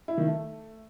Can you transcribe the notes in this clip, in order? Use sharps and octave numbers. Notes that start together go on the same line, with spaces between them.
E4
D#3
A3